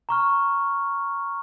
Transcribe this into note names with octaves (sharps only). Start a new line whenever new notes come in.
A#5 C#6 F6